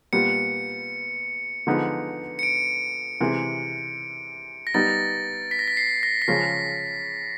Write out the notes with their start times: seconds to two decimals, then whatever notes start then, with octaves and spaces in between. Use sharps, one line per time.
0.13 A#2 G3 B3 C#7
1.67 D3 F3 G#3 B3 D#4
2.39 C#7
2.43 D7
3.21 C3 E3 G#3
4.67 A#6
4.74 G3 B3 D#4 A6
5.51 B6
5.59 A#6
5.68 B6
5.77 C7
6.03 A#6
6.22 B6
6.28 C#3 F3 G#3 C#4 A#6